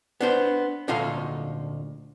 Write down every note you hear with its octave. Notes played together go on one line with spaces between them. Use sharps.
B3 D4 C5
D2 A#2 D#4 F4 A4 F5